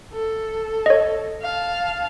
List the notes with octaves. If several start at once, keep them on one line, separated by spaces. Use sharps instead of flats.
A4
C#5 D#5
F5 A5